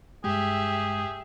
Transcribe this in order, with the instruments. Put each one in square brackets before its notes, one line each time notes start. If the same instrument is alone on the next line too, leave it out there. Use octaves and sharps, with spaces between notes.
[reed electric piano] G2 G#3 [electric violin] G4 E5 [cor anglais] G#4